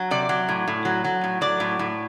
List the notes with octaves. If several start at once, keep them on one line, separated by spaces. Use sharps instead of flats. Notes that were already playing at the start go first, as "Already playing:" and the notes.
Already playing: F#3
C3 D5
F#3
A2
A2
F#3
F#3
A2
F#3 D5
A2
A2